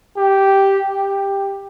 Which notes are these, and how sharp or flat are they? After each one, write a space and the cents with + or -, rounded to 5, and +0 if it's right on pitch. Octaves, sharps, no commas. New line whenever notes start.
G4 -5
G4 +10